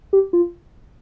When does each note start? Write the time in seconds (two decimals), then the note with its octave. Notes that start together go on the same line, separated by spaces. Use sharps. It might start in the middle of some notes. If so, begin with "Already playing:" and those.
0.13 G4
0.33 F4